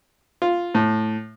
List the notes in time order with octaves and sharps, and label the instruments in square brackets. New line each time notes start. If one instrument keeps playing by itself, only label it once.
[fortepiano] F4
A2